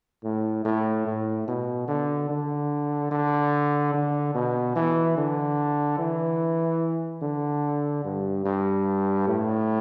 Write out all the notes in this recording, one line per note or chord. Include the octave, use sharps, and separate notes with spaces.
A2
A2
A2
B2
D3
D3
D3
D3
B2
E3
D3
E3
D3
G2
G2
A2